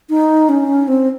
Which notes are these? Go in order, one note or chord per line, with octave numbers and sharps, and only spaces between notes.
D#4
C#4
C4